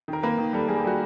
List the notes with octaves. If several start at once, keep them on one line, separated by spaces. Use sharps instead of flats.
D#3
A#4
A#3 B4
D#3
G3 A4
G3 G#4
G4
G3 F#4